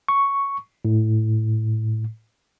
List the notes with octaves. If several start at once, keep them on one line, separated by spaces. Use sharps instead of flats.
C#6
A2